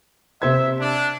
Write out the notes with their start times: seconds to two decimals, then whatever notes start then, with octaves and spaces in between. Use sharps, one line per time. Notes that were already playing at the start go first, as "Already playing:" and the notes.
0.42 C3 C5 E5 G#6
0.80 D4